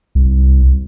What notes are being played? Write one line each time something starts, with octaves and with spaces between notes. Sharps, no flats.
C2